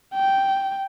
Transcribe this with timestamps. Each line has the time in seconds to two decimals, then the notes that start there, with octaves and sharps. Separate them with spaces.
0.14 G5